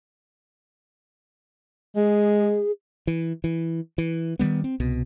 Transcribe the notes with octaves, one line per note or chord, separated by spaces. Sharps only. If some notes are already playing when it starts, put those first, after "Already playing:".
G#3 G#4
E3
E3
E3
D#3 E3 G3 B3
C4
C2 B2